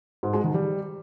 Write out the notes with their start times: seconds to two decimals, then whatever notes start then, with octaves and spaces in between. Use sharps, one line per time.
0.23 G#2
0.33 G#3
0.44 D#3
0.54 G3